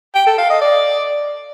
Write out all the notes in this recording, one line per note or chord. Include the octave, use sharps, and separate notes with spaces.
G5
A4
F5
D#5
D5